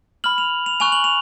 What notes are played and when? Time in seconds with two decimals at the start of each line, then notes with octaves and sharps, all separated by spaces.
0.24 B5 F6 F#7
0.38 F7
0.66 F7
0.80 G#5 C#6 F#6 F7
0.92 F#7
1.04 F7